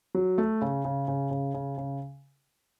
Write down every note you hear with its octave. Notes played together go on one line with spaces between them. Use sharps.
F#3
A3
C#3
C#3
C#3
C#3
C#3
C#3